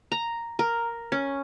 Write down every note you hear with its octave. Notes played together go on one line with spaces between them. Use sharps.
A#5
A#4
C#4